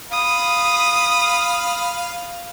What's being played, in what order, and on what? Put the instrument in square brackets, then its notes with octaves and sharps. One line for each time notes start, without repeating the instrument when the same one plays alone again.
[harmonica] F5 B5 [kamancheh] D#6